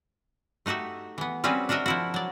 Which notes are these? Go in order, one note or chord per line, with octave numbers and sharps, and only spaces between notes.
A3 D#4 F#4 G4 E5
E3 B3
G3 C4 C#4 F#4 G#4 B4
D4 F#4 A#4 D#5 E5
F3 E4 F#4
F#3 D5